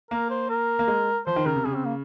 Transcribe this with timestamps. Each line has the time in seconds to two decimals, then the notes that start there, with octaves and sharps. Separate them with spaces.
0.11 A#3 A#4
0.30 C5
0.50 A#4
0.79 A#3
0.87 G#3
1.27 F3 C5
1.36 D#3
1.46 C#3 A#4
1.56 C3
1.65 C#3 G#4
1.75 C4
1.85 A#3